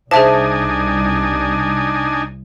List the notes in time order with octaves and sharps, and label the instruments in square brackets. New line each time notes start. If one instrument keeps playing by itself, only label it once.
[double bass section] C2 [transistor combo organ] D4 D#4 G#5 [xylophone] G#4 E5 A5 [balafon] C5